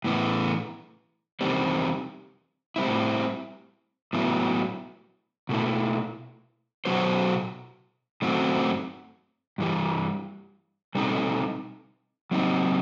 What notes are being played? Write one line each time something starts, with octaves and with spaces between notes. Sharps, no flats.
A2 E3 B3
E2 C3 D#3 G3 C4
A2 G3 C4 E4
A2 F#3 B3 E4
B2 A3 E4
B2 F#3 B3 F#4 C5
F#2 D#3 A3 C4 F#4
G2 E3 G3
B2 G3 C4 D#4 A4
F#3 C4 D#4